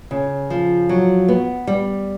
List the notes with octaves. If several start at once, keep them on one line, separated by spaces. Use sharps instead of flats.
C#3
F3
F#3
B3
G3